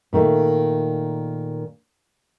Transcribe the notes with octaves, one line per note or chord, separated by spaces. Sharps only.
A#2 D#3 A3 D#4